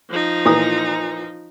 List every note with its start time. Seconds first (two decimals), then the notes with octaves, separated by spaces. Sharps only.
0.10 F3 D#4
0.46 A#2 E3 D#6